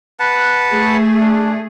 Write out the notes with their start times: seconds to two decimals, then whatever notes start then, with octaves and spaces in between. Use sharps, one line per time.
0.20 B4 F#5 A5
0.68 A3 G#4
1.20 D4